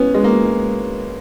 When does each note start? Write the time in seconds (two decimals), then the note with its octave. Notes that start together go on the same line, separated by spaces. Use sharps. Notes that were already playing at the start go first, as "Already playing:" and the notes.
Already playing: B3 C#4
0.14 G#3
0.24 A#3